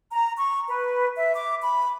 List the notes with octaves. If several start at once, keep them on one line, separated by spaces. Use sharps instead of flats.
A#5
C#6
B4
E5
D6
B5